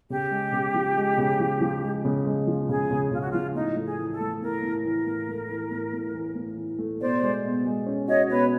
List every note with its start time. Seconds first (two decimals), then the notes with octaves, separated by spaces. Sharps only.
0.10 C#3 G4
0.31 G#3
0.52 C#3
0.74 F3
0.96 G#3
1.18 C#3
1.40 F3
1.61 F3
1.83 G#3
2.05 C#3
2.26 G#3
2.47 F3
2.69 C#3 G#4
2.91 C#3
3.11 C#3 F4
3.21 F#4
3.31 F3 F4
3.55 A2 D#4
3.76 A3
3.85 G#4
3.98 E3
4.12 A4
4.21 A3
4.41 A2 A#4
4.63 A2
4.84 E3 A#4
5.06 A2
5.29 A3
5.49 E3
5.71 A2
5.93 A2
6.14 E3
6.35 A2
6.57 E3
6.79 A3
7.00 B2 C5 D5
7.23 G#3
7.44 B2
7.66 G#3
7.86 C#4
8.08 F#4 C#5 D#5
8.29 B2 B4 C#5